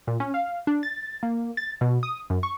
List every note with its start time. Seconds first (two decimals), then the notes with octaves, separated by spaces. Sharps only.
0.07 A#2
0.20 C#4
0.34 F5
0.67 D4
0.83 A6
1.23 A#3
1.57 A6
1.81 B2
2.03 D#6
2.30 F#2
2.43 C#6